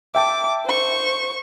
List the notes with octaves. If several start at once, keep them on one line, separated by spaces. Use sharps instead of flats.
E5 G5 A5 D6
C5 C#6